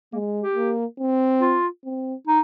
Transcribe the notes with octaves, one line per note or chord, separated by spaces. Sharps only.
G#3 A#3
G4
A#3
C4
F4
C4
D#4